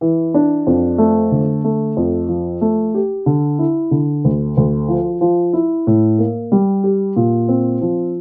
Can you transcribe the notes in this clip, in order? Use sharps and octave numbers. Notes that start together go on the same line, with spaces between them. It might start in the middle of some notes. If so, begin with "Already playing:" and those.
E3
D4
F2
A3
D3
A3
F2
F3
A3
G4
D3
E4
D3
D2
D2
F3
F3
E4
A2
A#3
G3
G4
A#2
C4
F3